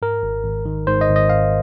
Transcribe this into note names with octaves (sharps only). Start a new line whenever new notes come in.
G#2 A#4
G#1
G#1
D#3
G#2 C5
D#5
G#1
D#5
G#1 F5